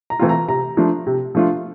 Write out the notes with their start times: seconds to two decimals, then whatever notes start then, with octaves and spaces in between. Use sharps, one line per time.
0.10 A#5
0.19 E3 A3 C4 F4
0.29 A#5
0.48 C3 A#5
0.77 F3 A3 D4 F4
1.07 C3
1.35 F3 A3 D4 F4